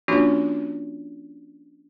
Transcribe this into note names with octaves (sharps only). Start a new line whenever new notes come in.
F3 A#3 C#4 D4 F4 F#4